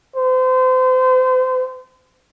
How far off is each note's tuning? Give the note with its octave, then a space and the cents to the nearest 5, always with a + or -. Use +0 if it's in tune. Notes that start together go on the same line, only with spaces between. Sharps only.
C5 -35